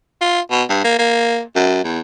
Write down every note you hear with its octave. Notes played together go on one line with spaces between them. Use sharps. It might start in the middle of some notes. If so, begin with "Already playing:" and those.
F4
B2
G2
A#3
A#3
F#2
E2